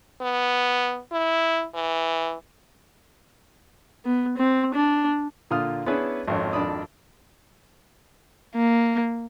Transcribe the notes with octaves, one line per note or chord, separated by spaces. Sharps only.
B3
E4
E3
B3
C4
D4
A#2 D3 F4 D#6 F6
B3 C#4 D4 E4 G#4 B4
G#1 F2 C#4
G#1 F2 D4 D5 B5 D#6
A#3